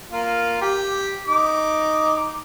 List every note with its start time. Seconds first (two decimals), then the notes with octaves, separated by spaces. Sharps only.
0.12 A#3 F4
0.61 G4
1.27 D#4 D6